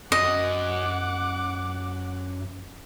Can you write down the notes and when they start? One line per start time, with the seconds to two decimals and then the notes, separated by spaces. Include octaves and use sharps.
0.12 F#2 D#5 F#5 D6